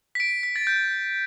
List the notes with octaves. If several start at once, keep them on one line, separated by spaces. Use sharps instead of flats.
B6
D7
B6
A6
G6